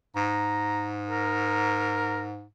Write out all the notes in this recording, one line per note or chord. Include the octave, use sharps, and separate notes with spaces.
G#2 A#5
A#4